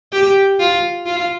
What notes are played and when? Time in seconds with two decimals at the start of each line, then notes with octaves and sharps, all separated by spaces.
0.13 G4
0.60 F4
1.06 F4